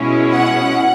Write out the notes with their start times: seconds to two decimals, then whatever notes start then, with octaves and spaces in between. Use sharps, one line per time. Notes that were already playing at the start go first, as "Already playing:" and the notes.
Already playing: B2 G#3 C#4 E4
0.32 F#5